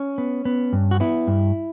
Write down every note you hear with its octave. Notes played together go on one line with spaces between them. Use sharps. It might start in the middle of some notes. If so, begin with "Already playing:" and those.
Already playing: C#4
B3
B3
G2
F#4
B3 E4
G2